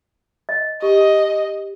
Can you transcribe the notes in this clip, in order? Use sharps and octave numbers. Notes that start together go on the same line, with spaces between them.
D#5
G4 D#5